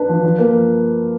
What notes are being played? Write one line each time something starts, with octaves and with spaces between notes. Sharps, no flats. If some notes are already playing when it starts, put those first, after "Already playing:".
Already playing: D4 B4
F3
F3
A#3